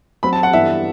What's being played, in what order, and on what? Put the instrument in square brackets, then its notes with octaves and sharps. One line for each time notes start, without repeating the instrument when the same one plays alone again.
[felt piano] F#3 C4 F#4 [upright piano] B5
[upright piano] A5
F#5
[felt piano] G2 E3 B3 [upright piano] E5